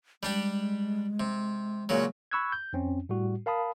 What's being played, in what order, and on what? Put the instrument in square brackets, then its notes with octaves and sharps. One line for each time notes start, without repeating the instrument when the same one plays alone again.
[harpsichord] G3 D4 G4 [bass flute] G#3
[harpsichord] C3
A#2 C#3 F#3
[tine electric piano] B5 C#6 E6 F#6 G#6
G6
F2 C4 C#4
A2 G3 F#4
A#4 F5 A5 B5 D#6